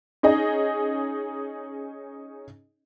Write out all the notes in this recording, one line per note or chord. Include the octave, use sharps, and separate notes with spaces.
C#4 D#4 G#4 D#5